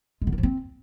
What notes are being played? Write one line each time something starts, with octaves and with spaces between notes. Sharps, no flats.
G#3
D3
D#3
F3
C4